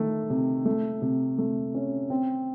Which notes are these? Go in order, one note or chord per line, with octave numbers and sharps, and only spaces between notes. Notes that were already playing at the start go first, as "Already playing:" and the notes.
Already playing: D#3 A3
C3
A3
C3
A3
C#4
C4